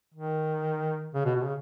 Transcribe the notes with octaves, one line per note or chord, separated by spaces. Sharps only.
D#3
C#3
B2
B2
C#3